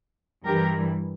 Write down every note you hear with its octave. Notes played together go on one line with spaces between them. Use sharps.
G2 E3 G3 G4 A#4